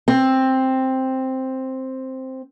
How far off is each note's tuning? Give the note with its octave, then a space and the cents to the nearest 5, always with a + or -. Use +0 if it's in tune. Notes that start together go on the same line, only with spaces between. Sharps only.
C4 +5